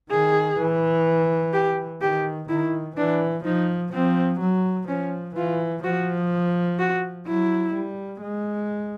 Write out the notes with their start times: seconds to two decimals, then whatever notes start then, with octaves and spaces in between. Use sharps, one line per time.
0.10 D#3 G#4
0.58 E3
1.53 G4
2.01 D#3 G4
2.49 D#3 E4
2.97 E3 D4
3.45 F3 D#4
3.92 F3 C4
4.40 F#3
4.88 F3 C#4
5.35 E3 F4
5.83 F3 F#4
6.79 F#4
7.26 F#3 E4
7.74 G3
8.22 G#3